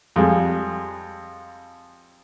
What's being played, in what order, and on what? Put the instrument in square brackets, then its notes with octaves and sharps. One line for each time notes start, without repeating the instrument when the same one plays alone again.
[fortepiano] F2 G3 G#3